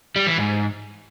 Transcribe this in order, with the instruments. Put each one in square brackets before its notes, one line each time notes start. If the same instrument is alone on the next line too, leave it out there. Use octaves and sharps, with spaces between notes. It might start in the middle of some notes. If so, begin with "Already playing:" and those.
[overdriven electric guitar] G3
E3
G#2